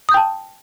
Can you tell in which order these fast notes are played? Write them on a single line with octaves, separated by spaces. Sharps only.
D#6 G6 G5 A5